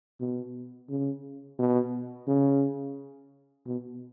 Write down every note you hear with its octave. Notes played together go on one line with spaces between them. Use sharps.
B2
C#3
B2
C#3
B2